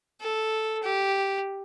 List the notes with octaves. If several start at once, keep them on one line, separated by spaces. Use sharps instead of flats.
A4
G4